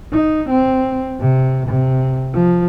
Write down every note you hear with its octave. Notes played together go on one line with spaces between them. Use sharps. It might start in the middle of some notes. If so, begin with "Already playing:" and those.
D#4
C4
C3
C3
F3